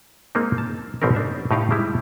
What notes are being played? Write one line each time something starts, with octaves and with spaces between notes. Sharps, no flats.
G#3 A#3 C4 D#4
A5
A1 B2 C4 C#4 A#4
D4 E5
A2 D#4 G4 F5
G3 G#3 E4